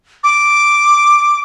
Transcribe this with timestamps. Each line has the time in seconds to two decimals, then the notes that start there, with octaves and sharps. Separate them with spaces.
0.24 D6